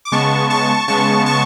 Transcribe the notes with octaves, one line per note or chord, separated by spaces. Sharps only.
D6
C#3 G#3 B3 A5 C#6
A5 C#6
C#3 G#3 B3 A5 C#6
A5 C#6